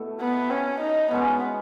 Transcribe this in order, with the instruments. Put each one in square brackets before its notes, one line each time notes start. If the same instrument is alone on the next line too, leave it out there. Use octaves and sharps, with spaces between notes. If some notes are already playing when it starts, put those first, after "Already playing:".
Already playing: [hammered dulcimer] B2 A3 E4
[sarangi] B3
C#4
D#4
[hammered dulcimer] B2 G#3 C#4 [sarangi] B3